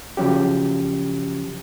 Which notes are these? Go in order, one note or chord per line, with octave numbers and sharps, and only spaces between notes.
C#3 F3 F#3 C#4 G4